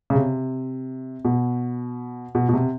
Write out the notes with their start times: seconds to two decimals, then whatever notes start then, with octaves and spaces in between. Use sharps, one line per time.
0.10 C#3
0.15 C3
1.25 B2
2.35 B2
2.49 B2
2.54 C3